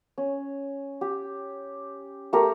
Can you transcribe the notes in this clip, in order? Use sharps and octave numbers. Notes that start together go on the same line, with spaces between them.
C#4
G4
A3 G4 A#4